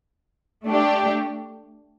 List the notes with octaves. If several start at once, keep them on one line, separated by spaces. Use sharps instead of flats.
A3 D4 G4